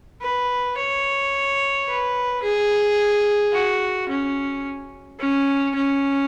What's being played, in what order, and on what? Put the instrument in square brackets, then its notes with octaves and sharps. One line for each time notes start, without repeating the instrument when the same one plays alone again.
[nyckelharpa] B4
C#5
B4
G#4
F#4
C#4
C#4
C#4